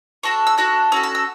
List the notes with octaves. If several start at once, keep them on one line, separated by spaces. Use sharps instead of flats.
D4 F#4 A4 C#6
E6
D4 F#4 A4 F#6
C#4 F#4 A4 E6
E6
E6